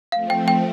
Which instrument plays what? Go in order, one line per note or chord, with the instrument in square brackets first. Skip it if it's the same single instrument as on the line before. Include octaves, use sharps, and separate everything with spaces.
[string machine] F3 A3 C4 [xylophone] F5
[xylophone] G5
G5